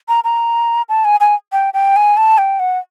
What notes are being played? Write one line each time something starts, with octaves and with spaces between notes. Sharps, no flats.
A#5
A#5
A5
G#5
G#5
G5
G5
G#5
A5
G5
F#5